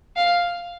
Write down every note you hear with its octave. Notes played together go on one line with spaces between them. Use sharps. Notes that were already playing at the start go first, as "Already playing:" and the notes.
F5